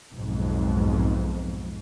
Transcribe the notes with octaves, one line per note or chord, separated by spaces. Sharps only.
B1 F2 G#2